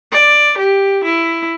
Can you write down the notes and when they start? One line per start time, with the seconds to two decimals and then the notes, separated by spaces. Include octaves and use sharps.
0.12 D5
0.58 G4
1.04 E4